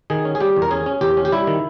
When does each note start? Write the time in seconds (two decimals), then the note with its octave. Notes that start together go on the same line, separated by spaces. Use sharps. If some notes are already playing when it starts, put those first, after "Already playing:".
0.10 D#3 G#4
0.25 C#4
0.35 G#4
0.40 G3 G4
0.56 E2
0.62 A#4
0.71 C#4 G#4
0.86 C#4
1.01 E2 G4
1.17 C#4
1.25 G4
1.32 G3 E4
1.47 D#3